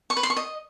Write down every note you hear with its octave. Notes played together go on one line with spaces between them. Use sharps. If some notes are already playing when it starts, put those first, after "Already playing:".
C#6
B4
C6
C#6
D#5